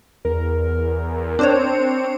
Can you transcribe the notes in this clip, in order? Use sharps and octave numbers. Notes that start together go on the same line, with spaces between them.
E2 A#4
C4 D4 C5 C#5